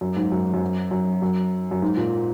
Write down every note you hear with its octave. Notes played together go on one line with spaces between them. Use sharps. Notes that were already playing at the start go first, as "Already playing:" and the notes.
F#2
G#2
F#2
F#2
F#2
F#2
F#2
G#2
A#2